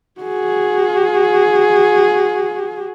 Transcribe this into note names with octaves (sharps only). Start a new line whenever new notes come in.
F#4 G#4